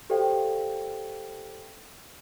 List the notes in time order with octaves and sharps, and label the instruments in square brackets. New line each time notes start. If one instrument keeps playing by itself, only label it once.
[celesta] G4 A4 C5 D5 F5 G5